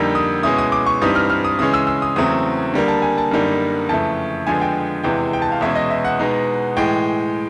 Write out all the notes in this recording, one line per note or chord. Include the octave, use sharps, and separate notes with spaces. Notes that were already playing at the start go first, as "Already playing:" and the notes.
Already playing: F2 D3 G3 A#3 D#4 E6
D#6
B2 G#3 C#4 E4 D#6
D#6
D6
C#6
G2 E3 G3 C4 D#4 D#6
F6
F6
D#6
C#3 E3 G#3 C#4 D#6
E6
E6
D#6
E2 C#3 F#3 A3 C4 D#6
D3 G3 A#3
A5
G#5
A5
F#2 D3 G3 A#3 D#4
F2 C#3 E3 A3 A5
F2 D3 F3 G#3 B3 G#5
G5
E2 C3 E3 G#3 G5
G5
A5
F5
E2 B2 G#3 C#4 E4 E5
D#5
E5
F#5
B2 G#3 B3 D#4
A2 E3 G#3 G5